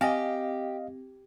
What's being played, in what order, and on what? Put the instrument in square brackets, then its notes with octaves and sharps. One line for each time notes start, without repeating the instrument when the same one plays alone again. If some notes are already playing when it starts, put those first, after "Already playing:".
[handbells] C4 A#6 [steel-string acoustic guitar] G4 [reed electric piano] D#5 F5 [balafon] G5 G#5